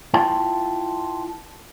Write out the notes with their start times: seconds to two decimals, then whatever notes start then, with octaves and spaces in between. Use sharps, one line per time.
0.14 E4 F4 G5 A5